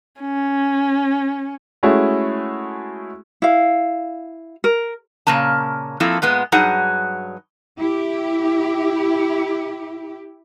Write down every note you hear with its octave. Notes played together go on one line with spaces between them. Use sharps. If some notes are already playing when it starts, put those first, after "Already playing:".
C#4
G#3 A3 C#4 E4 F#4 G#4
E4 F5
A#4
A#2 C#3 A#3 C#4 A5
F3 A#3 C4 E4 A4
A#2 G#3 B3
G2 F#3 D#4 G#4 F#5
E4 G4